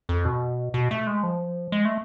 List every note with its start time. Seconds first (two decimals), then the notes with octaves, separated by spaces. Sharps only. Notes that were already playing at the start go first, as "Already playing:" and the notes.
0.09 F2
0.25 B2
0.74 B2
0.91 A3
1.07 G#3
1.23 F3
1.72 G#3
1.85 A3